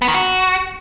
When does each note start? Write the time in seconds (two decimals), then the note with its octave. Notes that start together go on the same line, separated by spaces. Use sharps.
0.02 B3
0.08 D#3
0.14 F#4